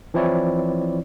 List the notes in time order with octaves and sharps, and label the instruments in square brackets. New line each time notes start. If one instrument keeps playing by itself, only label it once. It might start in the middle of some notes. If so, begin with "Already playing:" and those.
[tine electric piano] E3 F3 C4 E4 C#5 D5